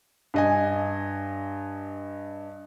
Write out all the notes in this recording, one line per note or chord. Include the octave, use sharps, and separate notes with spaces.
G2 D#5 G#5